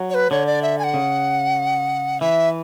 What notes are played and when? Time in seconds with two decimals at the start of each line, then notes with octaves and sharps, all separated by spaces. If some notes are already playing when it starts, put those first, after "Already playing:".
Already playing: F#3
0.10 C#5
0.14 B4
0.31 D3 C#5
0.47 D5
0.62 E5
0.79 G#5
0.84 F#5
0.94 C#3
2.21 E3 E5